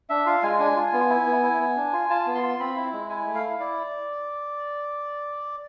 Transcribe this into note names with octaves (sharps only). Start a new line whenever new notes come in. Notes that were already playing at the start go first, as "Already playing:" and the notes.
D4 E5
F4 F5
G#3 G#5
D4 G#5
F4
B3
E4
B3
E4
B3
D4
F4
F4 A5
B3
C6
F4
C4 B5
E4
G#3
E4 G#5
A3
F5
E4
E4 D5